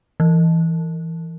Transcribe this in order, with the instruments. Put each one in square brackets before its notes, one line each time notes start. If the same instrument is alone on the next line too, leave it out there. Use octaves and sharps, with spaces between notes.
[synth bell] E3